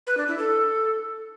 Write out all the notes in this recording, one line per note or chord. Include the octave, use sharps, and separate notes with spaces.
B4
D4
E4
A4